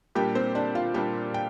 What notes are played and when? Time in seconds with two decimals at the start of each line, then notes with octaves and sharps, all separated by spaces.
0.15 A#2 G3 A#3 D4 G4 G5
0.35 C4 C5
0.55 D4 D5
0.75 F4 F5
0.94 A#2 G3 A#3 D4 G4 G5
1.34 G5